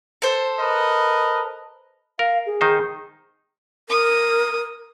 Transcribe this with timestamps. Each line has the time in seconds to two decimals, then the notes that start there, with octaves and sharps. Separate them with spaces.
0.22 A4 C5
0.60 A#4 B4 D#5
2.19 A#4 F5
2.46 G#4
2.61 D#3 D#4 C5
3.89 A#4 D#6